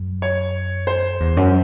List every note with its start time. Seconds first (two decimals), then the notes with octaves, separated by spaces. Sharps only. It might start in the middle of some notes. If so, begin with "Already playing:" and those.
Already playing: F#2
0.22 C#5
0.87 C5
1.20 E2
1.37 F#2